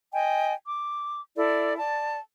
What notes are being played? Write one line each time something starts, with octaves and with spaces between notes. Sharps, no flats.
D#5 G5 G#5
D6
E4 A4 D5
D5 A5